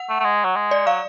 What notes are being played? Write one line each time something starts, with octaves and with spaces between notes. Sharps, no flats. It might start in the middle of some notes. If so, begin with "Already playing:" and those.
Already playing: F#5
A3
A3
G#3
F#3
G#3
D5
F#3 F5